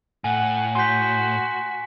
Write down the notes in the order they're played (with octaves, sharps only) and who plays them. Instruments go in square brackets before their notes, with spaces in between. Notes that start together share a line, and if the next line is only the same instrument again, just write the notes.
[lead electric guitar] A2 [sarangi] F#5 [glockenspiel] G#5
[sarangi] F#4 [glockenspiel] G#5 B6 [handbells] C6 G6